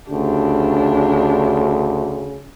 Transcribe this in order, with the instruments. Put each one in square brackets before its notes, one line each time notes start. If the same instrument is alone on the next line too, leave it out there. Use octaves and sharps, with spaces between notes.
[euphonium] D2 [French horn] C#3 [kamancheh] D4 G4